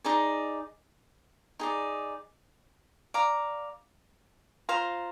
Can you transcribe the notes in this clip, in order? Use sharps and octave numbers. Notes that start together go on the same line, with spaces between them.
D#4 G#4 D5
D#4 G#4 D5
D5 F5 A#5
F4 C5 F5 A#5